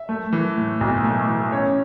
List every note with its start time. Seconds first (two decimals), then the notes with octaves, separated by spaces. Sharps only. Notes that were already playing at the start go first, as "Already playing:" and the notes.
Already playing: E5
0.09 A3
0.33 E3
0.57 A2
0.81 B1
1.04 A3
1.28 E3
1.52 C#4 C#5